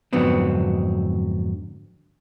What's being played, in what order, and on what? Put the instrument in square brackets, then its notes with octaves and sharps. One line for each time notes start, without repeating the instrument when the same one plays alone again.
[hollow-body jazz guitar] F2 G#2 D3 F#3 B3 C4